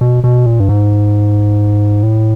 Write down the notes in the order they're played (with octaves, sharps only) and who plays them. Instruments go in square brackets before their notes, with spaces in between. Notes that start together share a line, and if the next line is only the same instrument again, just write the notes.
[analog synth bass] B2
B2
A#2
G2
G#2
A2